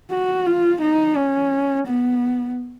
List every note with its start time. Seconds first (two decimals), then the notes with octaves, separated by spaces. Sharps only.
0.11 F#4
0.46 F4
0.81 D#4
1.16 C#4
1.87 B3